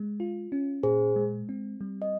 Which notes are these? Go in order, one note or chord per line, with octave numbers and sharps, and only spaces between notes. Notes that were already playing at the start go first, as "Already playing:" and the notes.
Already playing: G#3
F4
C#4
A#2 G#4 C5
G#3
C4
G3
D#5